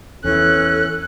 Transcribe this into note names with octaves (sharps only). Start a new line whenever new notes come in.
E2 E3 C#4 A4 F#6